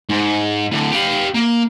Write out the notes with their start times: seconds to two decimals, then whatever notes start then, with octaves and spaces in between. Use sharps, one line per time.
0.10 G#2
0.71 A2 D3
0.91 G4 F5
1.35 A#3